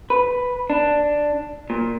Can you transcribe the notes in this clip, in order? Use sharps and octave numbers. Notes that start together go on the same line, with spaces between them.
B4
D4
A#2